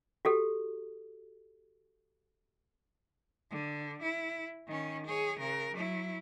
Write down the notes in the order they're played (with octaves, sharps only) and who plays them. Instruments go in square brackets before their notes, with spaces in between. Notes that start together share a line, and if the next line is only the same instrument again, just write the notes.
[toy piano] F#4 G4 A4
[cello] D3
E4
D#3 C#4
G#4 C#5
C#3 A#4
F#3 E4